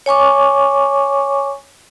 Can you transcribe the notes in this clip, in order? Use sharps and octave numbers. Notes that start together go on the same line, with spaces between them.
C#5 G#5 C#6 D6